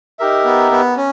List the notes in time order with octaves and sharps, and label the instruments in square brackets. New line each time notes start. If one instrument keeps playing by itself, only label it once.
[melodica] D#4 G4 A#4 E5
[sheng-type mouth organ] B3
B3
C#4